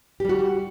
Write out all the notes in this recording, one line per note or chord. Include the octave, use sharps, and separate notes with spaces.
G3 F#4 G4